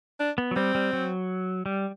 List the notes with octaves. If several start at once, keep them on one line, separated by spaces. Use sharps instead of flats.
D4
B3
F#3
G3 C4
G3
F#3
G3